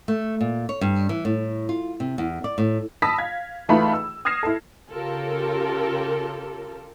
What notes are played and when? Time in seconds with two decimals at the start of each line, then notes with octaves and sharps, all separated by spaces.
0.08 A3
0.41 A#2
0.69 C#5
0.81 G2
1.09 E3
1.25 A2
1.69 F4
2.00 C3
2.18 E2
2.44 D5
2.58 A2
3.02 A5 B5 D#6 E6 A#6 B6
3.18 F5 G#6
3.68 C#2 E3 A3 D#4 F4 B5
3.93 E6
4.25 D#6 F6 G#6 A#6 C7 E7
4.43 E4 A4
4.92 C#3 F4 G4 A4 A#4